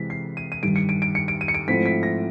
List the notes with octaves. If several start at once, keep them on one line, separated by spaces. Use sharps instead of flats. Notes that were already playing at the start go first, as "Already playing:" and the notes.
Already playing: C3 E3 G#3 B6
C7
D#7
D#7
G2 D#3 G3 D7
C#7
D7
D7
C#7
D7
D#7
C#7
D7
G#2 F3 A3 C4 E4 B6
B6
A#6